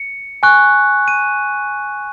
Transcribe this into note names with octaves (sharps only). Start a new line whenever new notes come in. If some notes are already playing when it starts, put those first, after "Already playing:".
Already playing: C#7
G#5 C#6 F#6
D#7